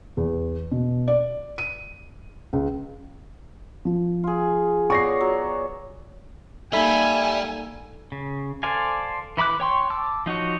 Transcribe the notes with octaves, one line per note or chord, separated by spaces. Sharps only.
E2
B2
D5
D#7
C#2
F3
F4 G#4
B3 C#5 D5 C#6 A#6 C7
F#3
G3 A#3 D#4 A4 E5 G#5 B5
C#3
A4 C5 D5 F5 G#5
E3 E4 B5 D6 F#6
C#5 G5 C6 C#6
A5 D6 E6
F3 D#4 F#4 C#5